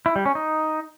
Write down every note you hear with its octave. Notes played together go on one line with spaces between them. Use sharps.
E4
G3
C#4
D#4